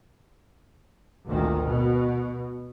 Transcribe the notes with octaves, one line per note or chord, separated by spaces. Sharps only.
G#1 D2 A#2 D#3
B2